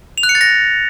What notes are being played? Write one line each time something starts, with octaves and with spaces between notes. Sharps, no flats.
F7
F#6
C#7
A6
A#6